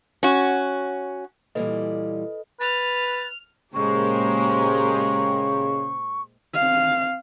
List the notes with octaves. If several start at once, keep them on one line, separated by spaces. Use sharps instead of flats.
C#4 F#4
A#2 E3 G3 A4 B4 D#5
B4 F6 A6
A#2 C#3 G#3 G4 G#4 A#4 C5 C#6
C4 F5